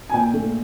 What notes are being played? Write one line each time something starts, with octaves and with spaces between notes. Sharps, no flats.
G#5
A#2 G5
A3